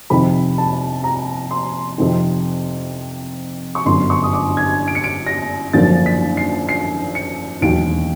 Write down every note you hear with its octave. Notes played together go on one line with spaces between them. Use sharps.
F2 C3 D#3 B5
A5
A#5
C6
F2 C3 D#3
C#6
G1 F#2 D3 C6
C#6
D#6
D6
G#6
D7
C#7
D7
A#6
G#1 F#2 D3 F3 A#3 A6
B6
C7
C7
C#7
E1 D#2 D#3 F#3 D7